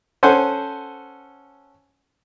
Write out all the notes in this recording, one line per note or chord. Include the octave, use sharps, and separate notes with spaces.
C#4 A4 C5 F#5 G#5 C6